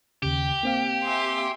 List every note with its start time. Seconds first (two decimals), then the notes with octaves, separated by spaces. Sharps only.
0.22 D#2 C#3 G4
0.63 A#3 C4 F5
1.03 E5 G#5 C6